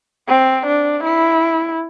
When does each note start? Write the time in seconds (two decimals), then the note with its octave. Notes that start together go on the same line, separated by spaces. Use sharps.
0.28 C4
0.67 D4
1.04 E4